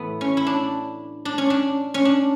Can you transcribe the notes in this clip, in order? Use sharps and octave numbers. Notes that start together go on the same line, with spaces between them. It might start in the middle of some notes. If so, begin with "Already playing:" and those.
Already playing: A2 E3 A3 B3
C#4
E4
D4
D4
C#4
D4
C#4
D4